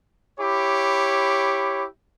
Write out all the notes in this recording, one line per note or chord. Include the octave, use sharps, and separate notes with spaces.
E4 G4 C#5 B5 D6